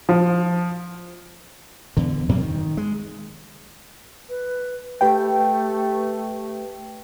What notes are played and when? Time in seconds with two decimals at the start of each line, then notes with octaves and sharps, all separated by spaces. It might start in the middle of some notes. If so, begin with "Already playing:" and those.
0.09 F3
1.97 E2 D3
2.29 F#2 C3 F#3 A#3
2.40 D#3
2.77 G#3
4.29 B4
5.01 A3 G4 B4 G5